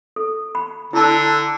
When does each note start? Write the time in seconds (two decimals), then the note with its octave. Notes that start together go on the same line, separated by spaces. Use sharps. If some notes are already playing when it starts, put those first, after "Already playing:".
0.16 A4
0.55 B5
0.93 D3 E4 A5